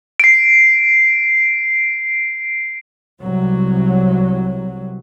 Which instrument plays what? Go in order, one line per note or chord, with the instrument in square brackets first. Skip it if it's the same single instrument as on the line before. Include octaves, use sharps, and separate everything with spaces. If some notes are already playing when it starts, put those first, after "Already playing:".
[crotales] C7 D7
[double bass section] C2 F#3